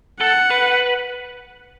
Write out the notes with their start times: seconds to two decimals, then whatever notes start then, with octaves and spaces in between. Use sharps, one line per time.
0.20 A4 F#5
0.51 B4